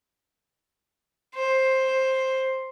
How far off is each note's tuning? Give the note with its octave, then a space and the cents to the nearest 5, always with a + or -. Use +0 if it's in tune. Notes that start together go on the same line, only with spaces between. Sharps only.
C5 +10